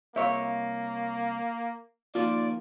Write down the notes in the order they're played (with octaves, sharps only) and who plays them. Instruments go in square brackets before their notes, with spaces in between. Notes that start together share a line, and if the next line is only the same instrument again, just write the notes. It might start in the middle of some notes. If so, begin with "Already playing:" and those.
[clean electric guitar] C2 C#5 [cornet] A#3 [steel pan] E5 F5
[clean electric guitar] D#3 F3 A#3 [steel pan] F4 [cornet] D5